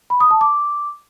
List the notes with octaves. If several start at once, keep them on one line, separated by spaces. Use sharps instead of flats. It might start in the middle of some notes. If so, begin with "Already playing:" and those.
B5
D#6
A5
D6